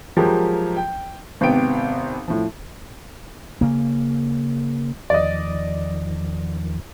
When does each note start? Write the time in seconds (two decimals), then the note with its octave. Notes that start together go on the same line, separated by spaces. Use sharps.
0.17 F3 F#3 G#3 G4 A#4
0.77 G5
1.41 G#1 C3 B3 G5 D7
2.28 A2 F3
3.61 C#3 A#3
5.10 E2 D#3 F3 D5 D#5